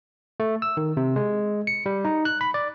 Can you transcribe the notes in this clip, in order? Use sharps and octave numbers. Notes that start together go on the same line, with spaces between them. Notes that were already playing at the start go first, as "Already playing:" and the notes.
A3
E6
D#3
C3
G#3
C#7
G3
D#4
F#6
B5
D5